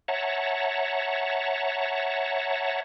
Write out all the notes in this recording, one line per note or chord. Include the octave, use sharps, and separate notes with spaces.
C#5 E5 F#5 A5 A#5